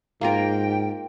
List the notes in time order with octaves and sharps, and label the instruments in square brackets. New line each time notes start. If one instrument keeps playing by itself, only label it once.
[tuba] G#2 [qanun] A#3 F4 A#4 [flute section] G5